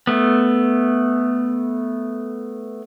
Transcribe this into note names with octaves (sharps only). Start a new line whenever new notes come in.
A3 B3